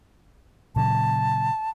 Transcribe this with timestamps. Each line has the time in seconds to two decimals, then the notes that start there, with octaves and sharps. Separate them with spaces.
0.76 A#2 C#3 F#3 A5